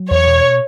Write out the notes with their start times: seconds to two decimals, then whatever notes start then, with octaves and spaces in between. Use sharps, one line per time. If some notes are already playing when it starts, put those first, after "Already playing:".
Already playing: F#3
0.10 E2 C#5
0.27 B2